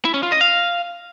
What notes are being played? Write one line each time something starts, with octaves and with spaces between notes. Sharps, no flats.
E4
C#4
F4
D#5
F5